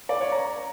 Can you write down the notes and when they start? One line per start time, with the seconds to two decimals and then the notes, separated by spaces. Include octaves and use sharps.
0.09 D5
0.21 C#5
0.32 A#5